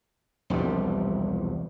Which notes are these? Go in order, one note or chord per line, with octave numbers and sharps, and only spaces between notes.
E1 C2 F3 G3